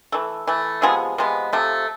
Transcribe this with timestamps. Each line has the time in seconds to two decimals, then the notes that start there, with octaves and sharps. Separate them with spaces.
0.12 E3 A3
0.47 E3 A3
0.82 C3 F3 G#3 B3 G#4
1.18 C3 F3 G#3 B3
1.53 C3 F3 A3